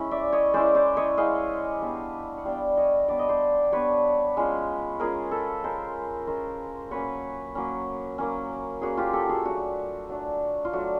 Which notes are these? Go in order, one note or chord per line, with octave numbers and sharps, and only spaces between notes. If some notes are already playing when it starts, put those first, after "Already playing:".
Already playing: G#3 C#4 E4 B4
D5 E5
C#5 D#5
G#3 C#4 E4 C5 D5
C5 D5
C#5 D#5
G#3 C#4 E4 D#5 F5
G3 B3 D4
F#5
G3 B3 D4 F5 G5
C#5 D#5
G3 B3 D4 D5
D#5
C5 D5
G3 B3 D4 B4 C#5
G#3 C#4 F4
G#3 C#4 F4 G#4 A#4
A4 B4
G#3 C#4 F4 A#4 C5
G#3 C#4 F4 A#4 C5
F#3 A#3 C#4 B4 C#5
F#3 A#3 C#4
F#3 A#3 C#4
F#3 A#3 C#4 F#4 G#4
F4 G4
G4 A4
F#4 G#4
F#3 A3 D4 F#4
F#3 A3 D4
F4
F#3 A3 D4 F#4